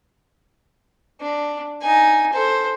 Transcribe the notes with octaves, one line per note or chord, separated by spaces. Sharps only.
D4
D#4 G#5
A4 C5